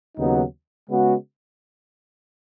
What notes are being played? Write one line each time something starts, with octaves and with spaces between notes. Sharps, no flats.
D#2 C#3 F#3 B3 D#4
C#3 G#3 B3 F#4